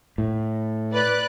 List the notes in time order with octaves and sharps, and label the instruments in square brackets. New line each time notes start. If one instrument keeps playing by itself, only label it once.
[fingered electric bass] A2
[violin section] B4 D5 F#6